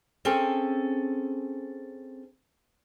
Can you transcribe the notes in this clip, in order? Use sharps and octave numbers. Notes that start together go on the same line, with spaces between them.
C4 C#4 G#4 A4